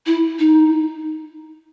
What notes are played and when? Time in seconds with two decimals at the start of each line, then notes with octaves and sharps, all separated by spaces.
0.06 E4
0.39 D#4